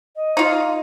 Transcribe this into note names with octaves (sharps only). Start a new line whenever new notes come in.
D#5
D#4 F4